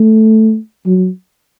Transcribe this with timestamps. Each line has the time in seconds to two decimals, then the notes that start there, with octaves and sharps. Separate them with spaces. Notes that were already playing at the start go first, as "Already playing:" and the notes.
Already playing: A3
0.86 F#3